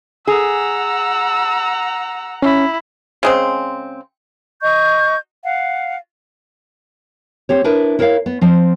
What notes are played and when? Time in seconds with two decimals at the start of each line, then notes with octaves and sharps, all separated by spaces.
0.27 G#4 F#5 A#5 E6
2.42 C#4 E4
3.23 C#3 G#3 C4
4.62 D#5 C#6 G6
5.43 F5 F#5
7.49 C4 G4 C#5
7.64 D4 E4 A#4 B4
7.99 E4 A#4 C#5 D5 F5
8.26 B3
8.41 F3 C4